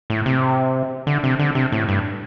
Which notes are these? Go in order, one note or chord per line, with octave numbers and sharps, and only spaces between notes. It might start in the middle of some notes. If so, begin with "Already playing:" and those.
A2
C3
D3
C3
D3
C3
A2
G2